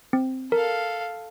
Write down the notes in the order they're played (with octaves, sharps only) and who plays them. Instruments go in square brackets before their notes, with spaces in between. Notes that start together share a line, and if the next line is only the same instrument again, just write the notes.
[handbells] C4
[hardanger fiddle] A4 F5 [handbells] A#4